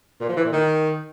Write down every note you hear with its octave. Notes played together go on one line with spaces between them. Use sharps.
A#2
F3
E3
A#2
D#3